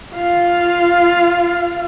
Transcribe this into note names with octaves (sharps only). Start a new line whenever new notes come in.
F4 F5